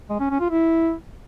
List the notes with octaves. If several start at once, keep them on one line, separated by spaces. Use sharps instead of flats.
G#3
C#4
C#4
F4
E4